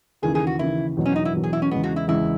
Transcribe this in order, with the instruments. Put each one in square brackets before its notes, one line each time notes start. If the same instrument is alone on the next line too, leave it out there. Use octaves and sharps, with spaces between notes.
[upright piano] D#2 C#3 E3 [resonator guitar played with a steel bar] G#4
[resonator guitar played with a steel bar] G#4
F#4
[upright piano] D#2 C#3 E3 [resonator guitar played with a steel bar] E4
[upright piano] E2 B2 F#3
[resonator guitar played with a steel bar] C#4
D#4
E4
[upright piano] E2 B2 F#3
[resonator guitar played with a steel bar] G#4
E4
C#4
[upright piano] E2 C#3 G#3 [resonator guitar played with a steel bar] B3
[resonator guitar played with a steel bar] F#4
E4
[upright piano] E2 C#3 G#3 [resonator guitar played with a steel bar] E4